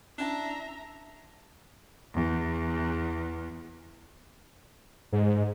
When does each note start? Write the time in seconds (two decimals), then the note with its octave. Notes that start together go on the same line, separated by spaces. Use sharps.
0.18 C#4 D4 E4 E5 A5 A#5
2.14 E2
5.12 G#2